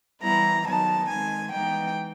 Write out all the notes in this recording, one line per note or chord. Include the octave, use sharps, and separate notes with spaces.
E3 G3 B3 E4 A#5
D#3 F#3 B3 D#4 A5
D#3 G#3 C4 G#5
E3 G#3 B3 D#4 G5